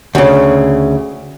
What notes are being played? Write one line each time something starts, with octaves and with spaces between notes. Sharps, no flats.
D2 C#3